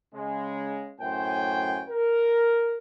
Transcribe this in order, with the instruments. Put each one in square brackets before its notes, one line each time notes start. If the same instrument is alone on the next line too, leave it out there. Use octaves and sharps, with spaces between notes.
[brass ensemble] C#3 G#3
F#2 A2 C5 G5 G#5
A#4